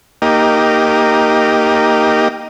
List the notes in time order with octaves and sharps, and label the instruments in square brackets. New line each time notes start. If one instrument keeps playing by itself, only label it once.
[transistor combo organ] A#3 D#4 G4